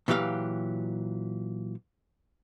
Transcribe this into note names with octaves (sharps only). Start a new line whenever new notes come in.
A#2 E3 F#3 G4 F5